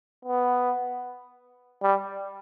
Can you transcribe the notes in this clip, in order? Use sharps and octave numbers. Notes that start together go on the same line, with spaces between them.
B3
G3